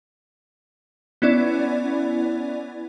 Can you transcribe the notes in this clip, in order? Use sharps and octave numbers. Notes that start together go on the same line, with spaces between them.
B3 C#4 E4 D5